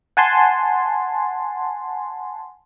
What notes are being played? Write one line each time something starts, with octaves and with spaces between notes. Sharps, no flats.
F#5 G#5 A5 C6